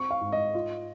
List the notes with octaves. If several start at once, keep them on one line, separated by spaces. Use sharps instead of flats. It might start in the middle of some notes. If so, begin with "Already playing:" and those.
Already playing: C4 C#6
F5
G#2
D#5
F4